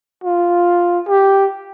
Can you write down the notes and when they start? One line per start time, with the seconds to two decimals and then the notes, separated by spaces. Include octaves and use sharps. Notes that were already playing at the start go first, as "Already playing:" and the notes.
0.24 F4
1.08 G4